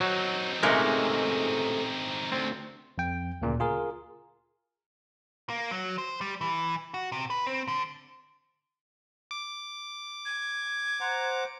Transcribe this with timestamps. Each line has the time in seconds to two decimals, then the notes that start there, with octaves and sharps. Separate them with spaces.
0.01 F#3 C4 D#4
0.63 C#2 G#2 C3 G#3 A3 A#4
2.32 D2 C4
2.98 F2 G5
3.42 D2 A#2 C#3
3.60 F4 G#4 A#4
5.50 A#3
5.71 F#3
5.98 C5
6.21 G3
6.41 E3
6.94 F#4
7.12 C3
7.30 B4
7.47 C4
7.68 D3
9.31 D6
10.25 G#6
11.00 C5 F#5 A#5